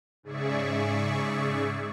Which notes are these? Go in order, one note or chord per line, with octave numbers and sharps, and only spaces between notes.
G#2 C#3 G#4 D5 E5 C#6